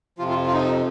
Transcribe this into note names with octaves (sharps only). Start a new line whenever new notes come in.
F2 C3 F3 F4
F4
F4
D#4